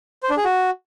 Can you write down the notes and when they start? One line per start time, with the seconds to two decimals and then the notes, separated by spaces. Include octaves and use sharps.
0.23 C5
0.30 D4
0.37 G#4
0.44 F#4